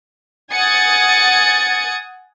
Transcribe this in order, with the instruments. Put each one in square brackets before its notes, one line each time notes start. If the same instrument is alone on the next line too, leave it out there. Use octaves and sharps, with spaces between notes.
[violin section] F#5 G#5 D#6 G#6 A6 C#7